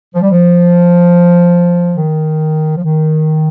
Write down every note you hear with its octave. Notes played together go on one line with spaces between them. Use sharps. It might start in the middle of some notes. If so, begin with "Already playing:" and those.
F3
G3
F3
D#3
F3
D#3